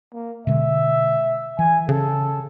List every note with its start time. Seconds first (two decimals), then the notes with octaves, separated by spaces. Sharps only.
0.13 A#3
0.47 B2 D3 G#3 E5
1.59 E3 G#5
1.89 C#3 A4